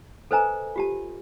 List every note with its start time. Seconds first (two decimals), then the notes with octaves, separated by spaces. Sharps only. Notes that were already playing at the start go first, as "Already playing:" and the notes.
0.31 A4 B4 C5 D#5 G#5 A#5
0.76 F4 G4 A5